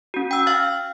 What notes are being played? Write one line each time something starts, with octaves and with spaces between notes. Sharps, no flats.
C#4 F#4
G5 E6
F5 G5 F6 A6